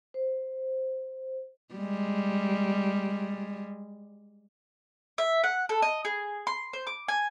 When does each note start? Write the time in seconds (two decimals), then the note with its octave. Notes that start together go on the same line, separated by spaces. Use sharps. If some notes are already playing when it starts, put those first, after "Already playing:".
0.14 C5
1.75 G3 G#3
5.18 E5
5.44 F#5
5.69 A4
5.82 D#5
6.05 G#4
6.47 C6
6.73 C5
6.87 D6
7.08 G#5